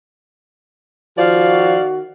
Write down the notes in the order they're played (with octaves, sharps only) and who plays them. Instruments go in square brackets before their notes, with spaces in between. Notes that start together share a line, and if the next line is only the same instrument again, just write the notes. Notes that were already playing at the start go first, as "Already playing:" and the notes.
[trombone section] D#3 F#4 [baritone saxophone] F3 [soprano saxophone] D5 [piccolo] F5